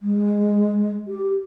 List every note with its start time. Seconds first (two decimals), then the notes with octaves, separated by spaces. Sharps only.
0.01 G#3
1.08 G4